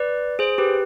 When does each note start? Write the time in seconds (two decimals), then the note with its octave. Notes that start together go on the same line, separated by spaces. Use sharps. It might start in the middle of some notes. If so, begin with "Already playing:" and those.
Already playing: B4 D5
0.39 G#4 C5
0.58 G4 B4